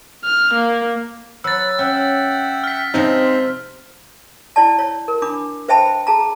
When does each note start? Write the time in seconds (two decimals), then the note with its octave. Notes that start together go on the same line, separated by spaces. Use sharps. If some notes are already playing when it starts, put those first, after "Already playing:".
0.25 F6
0.54 A#3
1.44 F#3 B4 E6 A6
1.79 C#4 E5 F#5 G5
2.64 F6 B6
2.94 C3 F3 G#3 C4 D#4
3.24 C5
4.56 E4 D5 A5
4.79 C#5
5.08 A#4
5.22 D4 B5 D6
5.68 B4 C5 E5 G5 A5 B5
6.07 G#4 A5 A#5